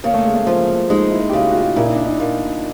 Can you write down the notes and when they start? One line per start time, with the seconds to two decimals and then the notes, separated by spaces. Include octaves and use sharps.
0.04 C#3 A#3
0.14 A3
0.25 G#3
0.35 A3
0.47 F3
0.90 G#3 D#4
1.12 E4
1.29 G4
1.33 C#3 F#4
1.50 F#4
1.55 F4
1.76 A#2 E4
1.86 D#4
1.96 D4
2.06 D#4
2.20 A#2